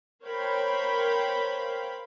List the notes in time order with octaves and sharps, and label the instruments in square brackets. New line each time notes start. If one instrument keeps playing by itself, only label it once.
[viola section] A#4 C5 C#5 F5 G5 B5